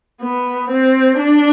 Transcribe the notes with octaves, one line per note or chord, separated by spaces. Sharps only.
B3
C4
D4